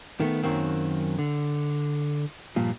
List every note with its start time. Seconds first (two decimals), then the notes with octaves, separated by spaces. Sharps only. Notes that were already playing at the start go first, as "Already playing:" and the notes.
0.20 D#3 A3 B3
0.43 F#2 D#3 F#3 A#3 C4
1.19 D3
2.56 G2 A#2 F3